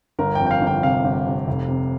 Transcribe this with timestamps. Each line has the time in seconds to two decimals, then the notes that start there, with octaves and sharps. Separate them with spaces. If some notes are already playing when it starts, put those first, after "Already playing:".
0.19 G1 A#4
0.35 G5
0.40 F2
0.47 G5
0.51 F5
0.61 G1
0.67 G5
0.83 C3 F5
1.04 G1
1.26 C3
1.47 F1
1.68 C3